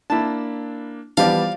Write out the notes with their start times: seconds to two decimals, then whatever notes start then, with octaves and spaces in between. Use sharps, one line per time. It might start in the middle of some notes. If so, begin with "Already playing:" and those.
0.10 A#3 D4 E4 A5
1.17 E3 F3 G3 B3 G4 D5 F5 A5